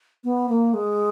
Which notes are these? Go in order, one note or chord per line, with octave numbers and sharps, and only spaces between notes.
B3
A#3
G#3